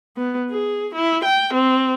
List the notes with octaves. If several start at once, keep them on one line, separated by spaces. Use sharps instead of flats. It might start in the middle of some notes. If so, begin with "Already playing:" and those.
B3
G#4
E4
G5
C4